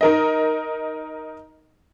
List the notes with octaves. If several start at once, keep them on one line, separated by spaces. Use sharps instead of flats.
D#4 A#4 D#5